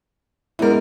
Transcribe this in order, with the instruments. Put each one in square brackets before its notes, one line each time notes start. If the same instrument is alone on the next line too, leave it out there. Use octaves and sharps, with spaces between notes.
[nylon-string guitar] F#2 A#4 [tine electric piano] G#3 B3 E4